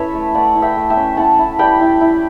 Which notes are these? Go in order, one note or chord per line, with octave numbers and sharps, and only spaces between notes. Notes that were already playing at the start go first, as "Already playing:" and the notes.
Already playing: C#4 E4 A4 B4 C#5 E5
A3
A3 D5 F#5
E4
E5 G5
A3
E5 G5
C#4
E4 F#5 A5
E4
G3 G5 B5
E4
E4